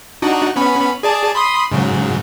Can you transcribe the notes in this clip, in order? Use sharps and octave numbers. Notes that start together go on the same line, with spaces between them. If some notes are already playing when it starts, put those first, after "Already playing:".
D4 D#4 F#4
B3 C#4 B5
G#4 D5 A5
B5 C6 D#6
G#2 C#3 F#3